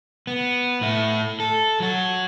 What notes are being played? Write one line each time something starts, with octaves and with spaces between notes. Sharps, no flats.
B3
A2 E4
A4
F#3 F#4